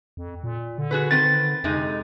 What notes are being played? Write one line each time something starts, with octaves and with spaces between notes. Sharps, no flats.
F2
A#2
D3
F#4 G#4 B4
D#3 C4 B4 A6
F2 C3 G#3 D#4